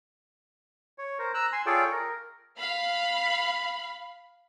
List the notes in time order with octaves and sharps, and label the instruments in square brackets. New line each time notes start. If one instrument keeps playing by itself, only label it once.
[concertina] C#5
A#4 C5
A#5 E6 F#6
G#5 C6
F4 G#4 A4 C#5 D5 G5
A#4
[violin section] F5 B5